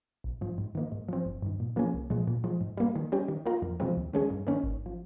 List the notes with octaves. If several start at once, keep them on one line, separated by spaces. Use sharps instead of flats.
A#1
G#2 F3
G#2
D#3 A#3 D#4
G#2
F3 C4
G1
G2 D#3
A#2
F3 A#3 C#4 G#4
C2
A#2 F3 G#3
A#2
F3 G#3
G#2
G3 A#3
D#3
G3 C#4 G4
D#3
A#3 F4 A#4
F2
C3 F3 G#3 C4
D#2
D#3 G#3 C#4 G#4
G2
D#3 A#3 C#4
G#1
F3